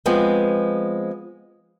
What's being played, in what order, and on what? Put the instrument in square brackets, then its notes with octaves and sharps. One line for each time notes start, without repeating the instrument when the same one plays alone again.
[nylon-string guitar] F3 G#3 B3 C4